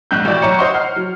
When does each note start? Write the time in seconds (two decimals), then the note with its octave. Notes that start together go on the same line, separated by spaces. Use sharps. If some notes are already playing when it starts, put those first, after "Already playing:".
0.11 A#1 G#2 F#6 G6
0.25 A1 B2 D5 G6
0.42 B1 C#5 A#5 C#7
0.59 C5 C#5 D#5 F#5 C6
0.74 F#5 F6 C7
0.96 F#3